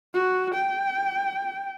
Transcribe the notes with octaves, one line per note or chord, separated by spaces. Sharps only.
F#4
G5